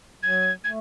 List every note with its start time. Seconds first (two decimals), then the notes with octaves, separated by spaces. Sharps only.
0.23 F#3 G#6
0.64 A3 G#6